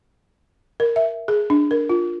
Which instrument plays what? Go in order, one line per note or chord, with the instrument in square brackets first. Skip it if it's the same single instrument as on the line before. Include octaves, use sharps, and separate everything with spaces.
[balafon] A#4
E5
G#4
D4
A#4
F4